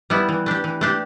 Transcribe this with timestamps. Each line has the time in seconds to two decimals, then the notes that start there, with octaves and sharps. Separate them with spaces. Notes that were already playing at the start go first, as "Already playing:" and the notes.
0.10 G3 B3 E4
0.29 E3
0.46 A3 D4 G4
0.64 E3
0.81 A3 D4 G4